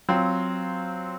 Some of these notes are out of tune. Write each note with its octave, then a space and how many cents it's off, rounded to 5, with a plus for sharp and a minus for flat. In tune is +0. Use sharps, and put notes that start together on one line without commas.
F#3 -5 C4 -5 F4 +0